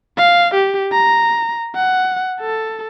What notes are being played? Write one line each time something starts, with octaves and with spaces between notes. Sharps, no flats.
F5
G4
A#5
F#5
A4